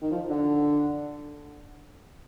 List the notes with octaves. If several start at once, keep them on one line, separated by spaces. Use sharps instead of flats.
D#3
F3
D3